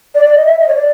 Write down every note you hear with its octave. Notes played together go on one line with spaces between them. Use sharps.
D5
D5
D#5
E5
D#5
C#5
D5